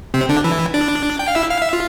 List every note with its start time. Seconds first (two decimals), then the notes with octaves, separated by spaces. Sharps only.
0.14 C3 C4
0.29 D3 D4
0.44 E3 E4
0.74 D4 D5
1.19 G5
1.28 F5
1.35 E4 E5
1.50 F5
1.62 E5
1.73 F4